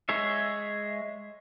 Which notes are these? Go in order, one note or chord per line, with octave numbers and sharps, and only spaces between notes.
G#3 G#4 C#5 E5